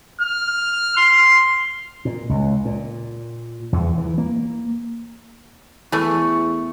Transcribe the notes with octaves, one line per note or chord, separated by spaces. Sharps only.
F6
C6
A#2
C#2
A#2
E2
E3
A#3
E2 E3 A3 C#6